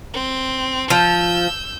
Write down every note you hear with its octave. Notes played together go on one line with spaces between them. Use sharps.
C4
F3 E6 G6